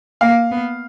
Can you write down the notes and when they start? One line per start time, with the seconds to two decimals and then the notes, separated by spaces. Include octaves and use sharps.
0.21 A#3 F5
0.51 B3